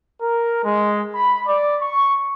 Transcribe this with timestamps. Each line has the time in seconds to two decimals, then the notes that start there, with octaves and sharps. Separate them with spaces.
0.21 A#4
0.64 G#3
1.15 B5
1.47 D5
1.82 C#6